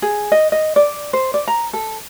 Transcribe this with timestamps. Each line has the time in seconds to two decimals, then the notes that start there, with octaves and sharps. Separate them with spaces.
0.02 G#4
0.32 D#5
0.52 D#5
0.76 D5
1.13 C5
1.34 D5
1.48 A#5
1.73 A4